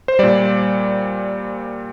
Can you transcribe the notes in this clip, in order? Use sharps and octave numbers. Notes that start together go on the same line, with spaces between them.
C5
A#2 G3 D5